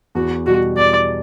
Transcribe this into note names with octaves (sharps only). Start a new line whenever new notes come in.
E2 F#4
B2 G3 F#4
E2 D5